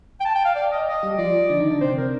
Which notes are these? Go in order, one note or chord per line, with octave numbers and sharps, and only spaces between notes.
G5
A5
G5
F5
D5
D#5
D#5
G3 G4
F3 F4 D5
D3 D4
D#3 D#4
D3 D4
C3 C4 C5
A#4